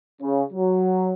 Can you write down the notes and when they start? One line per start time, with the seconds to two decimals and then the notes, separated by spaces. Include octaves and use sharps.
0.22 C#3
0.53 F#3